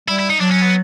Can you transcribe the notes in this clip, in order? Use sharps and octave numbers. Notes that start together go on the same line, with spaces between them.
G3 E4
E4
D#4
F#3 D4
C#4
B3